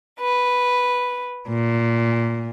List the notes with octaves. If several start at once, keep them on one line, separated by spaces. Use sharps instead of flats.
B4
A#2